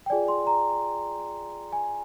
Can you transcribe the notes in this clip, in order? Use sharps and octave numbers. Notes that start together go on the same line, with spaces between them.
G5
F4 G#4 D5 G#5
C6
A#5
G#5